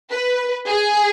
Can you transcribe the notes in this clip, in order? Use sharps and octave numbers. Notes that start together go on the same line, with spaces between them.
B4
G#4